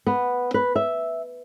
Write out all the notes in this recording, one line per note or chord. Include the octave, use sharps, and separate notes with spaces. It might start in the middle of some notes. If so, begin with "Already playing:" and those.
B3
B4
E5